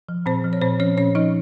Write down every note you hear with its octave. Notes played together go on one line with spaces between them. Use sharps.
F3
A#2 C4 C5
F3
C#5
A#2 C4 C5
F3 C#4 C#5
A#2 C#4 C#5
F3 D#4 D#5